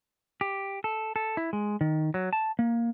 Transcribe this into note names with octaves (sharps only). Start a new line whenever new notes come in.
G4
A4
A4
E4
G#3
D#3
F#3
A5
A#3